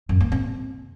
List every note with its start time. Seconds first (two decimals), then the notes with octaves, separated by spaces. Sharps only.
0.09 F#2
0.20 A#3
0.32 C3